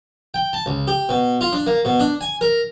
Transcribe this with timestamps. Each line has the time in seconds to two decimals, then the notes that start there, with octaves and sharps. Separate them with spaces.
0.34 G5
0.53 A5
0.66 C#2
0.88 G4
1.09 B2
1.41 F4
1.53 D4
1.67 A#3
1.85 B2
2.00 D4
2.21 G#5
2.41 A#4